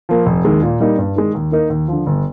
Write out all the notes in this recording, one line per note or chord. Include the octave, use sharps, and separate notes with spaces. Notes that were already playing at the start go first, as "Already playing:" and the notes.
F3 A#3
F1
D#2 D#3 G#3
A#2
G3 A#3 D#4
G2
D#3 G#3
D#2
D#3 A#3 D#4 A#4
D#2
D3 F3
G1